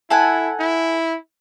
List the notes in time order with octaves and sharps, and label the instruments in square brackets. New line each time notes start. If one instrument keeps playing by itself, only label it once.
[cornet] E4 [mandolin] A4 F#5 G#5
[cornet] E4